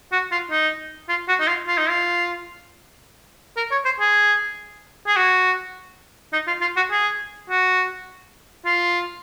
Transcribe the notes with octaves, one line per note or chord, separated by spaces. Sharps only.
F#4
F4
D#4
F4
F#4
D#4
F4
F4
D#4
F4
A#4
C#5
C5
G#4
G#4
F#4
D#4
F4
F4
F#4
G#4
F#4
F4